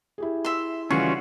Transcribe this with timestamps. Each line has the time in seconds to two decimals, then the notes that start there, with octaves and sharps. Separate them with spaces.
0.18 E4 G4 G#4
0.45 E5 C6
0.91 C#3 E3 G3 C#4 F4 F#4 C#6